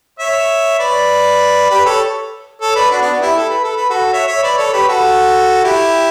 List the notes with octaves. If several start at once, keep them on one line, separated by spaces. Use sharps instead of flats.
C#5 E5
B4 D5
G4 B4
A4 C#5
A4 C#5
B4 D5
D4 F#4
B3 D4
B3
E4 G4
A4
B4
A4
B4
F#4 A4
C#5 E5
C#5 E5
B4 D5
A4 C#5
G4 B4
F#4 A4
E4 G4